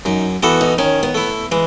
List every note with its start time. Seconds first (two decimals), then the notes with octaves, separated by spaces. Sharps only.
0.05 F#2 D#4
0.42 E3 B3 E4 F#4 A4
0.61 D#4
0.78 D#3 C#4
1.03 B3
1.15 A3 E4
1.52 E3 G#3